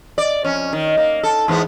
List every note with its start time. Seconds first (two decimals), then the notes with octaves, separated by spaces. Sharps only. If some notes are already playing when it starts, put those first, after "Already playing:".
0.18 D5
0.44 F2 C#4
0.73 D#3
0.97 A#3
1.23 A4
1.48 E2 G#2 B3